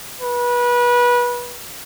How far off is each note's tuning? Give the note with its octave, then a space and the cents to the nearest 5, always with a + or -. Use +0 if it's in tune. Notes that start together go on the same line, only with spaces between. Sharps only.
B4 -25